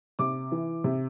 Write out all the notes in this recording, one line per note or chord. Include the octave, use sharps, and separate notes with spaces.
C3 D6
E3
C3